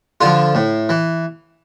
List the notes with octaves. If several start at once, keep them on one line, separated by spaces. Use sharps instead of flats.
D3 F3 F4
A2
E3